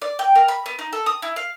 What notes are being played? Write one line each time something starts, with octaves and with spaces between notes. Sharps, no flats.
D5
G5
A#4
B5
B3
D#4
A4
D#6
E4
F5